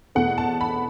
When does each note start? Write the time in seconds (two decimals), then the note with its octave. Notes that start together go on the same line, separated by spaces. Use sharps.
0.15 E2 B2 A3 F#5
0.38 A5
0.61 B5